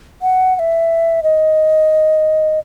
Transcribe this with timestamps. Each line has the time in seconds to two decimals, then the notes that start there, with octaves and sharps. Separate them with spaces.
0.22 F#5
0.56 F#5
0.59 E5
1.23 D#5